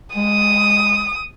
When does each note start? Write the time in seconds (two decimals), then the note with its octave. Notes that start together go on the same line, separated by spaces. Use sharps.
0.16 G#3 D#6